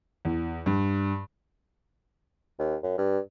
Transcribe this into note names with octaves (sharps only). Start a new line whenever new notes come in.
E2
G2
D#2
F#2
G2